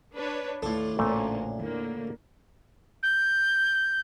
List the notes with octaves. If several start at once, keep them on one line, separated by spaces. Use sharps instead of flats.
D4 B4 C#5
D#2 A2 D#3 D4 F4 A4
A1 D2 A#2 C#3 A3 A#3 C#4 D5
E2 D3 A#3
G6